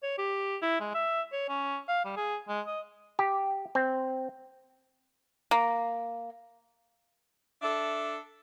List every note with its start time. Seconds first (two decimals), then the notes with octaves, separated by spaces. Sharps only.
0.03 C#5
0.18 G4
0.62 E4
0.80 G#3
0.95 E5
1.33 C#5
1.49 C#4
1.88 F5
2.05 G3
2.17 G#4
2.49 G#3
2.67 D#5
3.19 G4
3.75 C4
5.51 A#3
7.62 D4 A4 E5